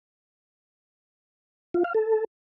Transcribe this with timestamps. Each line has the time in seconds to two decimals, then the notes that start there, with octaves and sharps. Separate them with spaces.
1.74 F4
1.84 F5
1.94 A4